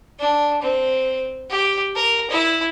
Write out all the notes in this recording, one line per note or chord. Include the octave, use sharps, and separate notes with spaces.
D4
C4
G4
A#4
E4